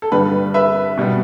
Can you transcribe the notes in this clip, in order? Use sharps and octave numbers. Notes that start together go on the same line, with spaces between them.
A4
G2 D3 G3 B4
B4 E5
B2 G3 B3